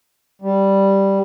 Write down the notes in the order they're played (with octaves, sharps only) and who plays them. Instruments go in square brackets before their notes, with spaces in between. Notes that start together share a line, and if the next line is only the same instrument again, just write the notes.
[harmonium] G3